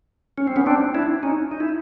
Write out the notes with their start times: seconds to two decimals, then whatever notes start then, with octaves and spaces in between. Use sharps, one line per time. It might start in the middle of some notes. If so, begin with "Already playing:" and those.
0.38 C#4
0.47 C4
0.56 B3 C#4
0.66 C4 D4
0.95 D4 E4
1.23 C#4 D#4
1.51 D#4
1.60 E4